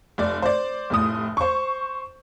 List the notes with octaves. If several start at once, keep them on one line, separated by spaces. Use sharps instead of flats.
F1 D5
C5 D5
F1 A2 D#6
C5 C#6